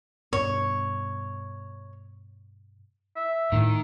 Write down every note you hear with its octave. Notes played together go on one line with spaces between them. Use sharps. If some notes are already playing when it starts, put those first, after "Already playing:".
G2 B2 C#5
E5
A2 D#3